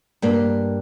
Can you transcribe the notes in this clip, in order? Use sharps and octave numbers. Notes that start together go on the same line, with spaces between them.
G2 A#3